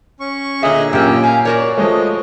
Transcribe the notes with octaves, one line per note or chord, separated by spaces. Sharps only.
C#4 C#6
A#2 D3 G#4 D#5 E5
F#2 A#2 A#3 C#4 G4 G5
F5 G#5 A#5
F#4 A#4 C#5 D5
F3 G#3 A3 D#5